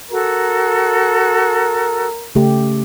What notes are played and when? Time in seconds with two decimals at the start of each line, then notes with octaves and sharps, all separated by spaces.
0.11 F#4 A4 A#4
2.35 C#3 A3 G4